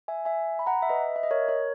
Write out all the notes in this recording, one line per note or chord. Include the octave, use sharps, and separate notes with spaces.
E5 G#5
E5 G#5
B5
F#5 A#5
E5
B4 D#5
E5
D#5
A#4 C#5
A#4 C#5